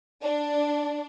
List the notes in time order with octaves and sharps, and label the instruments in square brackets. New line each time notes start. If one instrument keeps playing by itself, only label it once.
[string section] D4